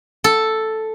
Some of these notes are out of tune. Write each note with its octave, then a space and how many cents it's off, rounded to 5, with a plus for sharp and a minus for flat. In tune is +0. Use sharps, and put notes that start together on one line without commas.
A4 +0